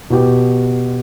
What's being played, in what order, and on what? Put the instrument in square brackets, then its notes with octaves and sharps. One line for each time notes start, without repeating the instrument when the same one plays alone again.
[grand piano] B2 B3 G4